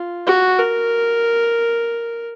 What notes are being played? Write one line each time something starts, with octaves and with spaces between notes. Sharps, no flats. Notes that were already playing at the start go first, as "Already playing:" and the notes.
Already playing: F4
F#4
A#4